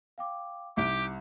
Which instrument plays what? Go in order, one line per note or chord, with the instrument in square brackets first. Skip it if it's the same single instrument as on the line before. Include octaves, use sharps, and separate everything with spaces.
[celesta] F5 G5 D6
[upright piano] C2 [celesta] D#4 [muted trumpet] G4 [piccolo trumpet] D6